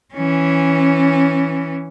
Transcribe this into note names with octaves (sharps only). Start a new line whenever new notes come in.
E3 C#4